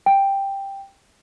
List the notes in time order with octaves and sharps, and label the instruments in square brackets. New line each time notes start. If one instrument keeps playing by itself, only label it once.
[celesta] G5